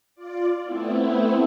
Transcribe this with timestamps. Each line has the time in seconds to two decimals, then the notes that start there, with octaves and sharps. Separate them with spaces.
0.15 F4 D5
0.64 A3 B3 C4 E4